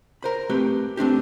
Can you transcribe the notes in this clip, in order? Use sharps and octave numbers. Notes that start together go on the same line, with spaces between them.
A#4 C5 B5
A3 C4 G4 B4
A3 C4 D4 G4